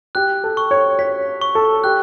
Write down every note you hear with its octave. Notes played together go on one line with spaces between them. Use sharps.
G4 F#6
A4
C#6
C#5
C#5 B6
C#6
A4
G4 F#6